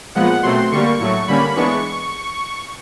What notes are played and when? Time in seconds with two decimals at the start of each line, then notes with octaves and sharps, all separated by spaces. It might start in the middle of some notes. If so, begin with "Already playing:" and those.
0.15 A#2 F3 G#3 B3 F#5
0.43 B2 F#3 A3 C4 C6
0.71 D3 G3 A#3 C#6
1.00 A2 F#3 A3 C#6
1.28 D3 G3 A#3 C#4 B5
1.56 E3 G#3 B3 D4 C#6